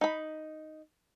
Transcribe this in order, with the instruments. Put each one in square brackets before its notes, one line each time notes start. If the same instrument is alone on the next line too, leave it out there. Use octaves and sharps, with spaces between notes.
[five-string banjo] D#4 B5